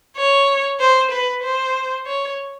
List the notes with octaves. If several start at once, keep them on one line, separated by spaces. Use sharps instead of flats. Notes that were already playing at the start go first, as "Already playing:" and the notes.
C#5
C5
B4
C5
C#5